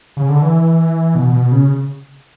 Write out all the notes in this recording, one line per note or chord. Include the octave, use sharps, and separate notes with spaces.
C#3
D3
E3
B2
B2
C#3